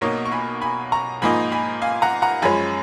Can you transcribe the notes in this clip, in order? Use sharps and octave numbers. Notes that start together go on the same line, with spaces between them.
B1 B2 A#3 D#4 A#4 C#5
C#6
G#5 B5
G#5 B5
A#5 C#6
G#2 F3 A#3 D#4 G#5 B5
G#5 B5
F5 G#5
F#5 A#5
F#5 A#5
F#2 F3 G#3 C#4 G#5 B5